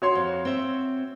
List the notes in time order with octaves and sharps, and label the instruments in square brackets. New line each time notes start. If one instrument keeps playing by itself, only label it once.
[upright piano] F#4 C#5 C6
[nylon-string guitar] F2
C4 E5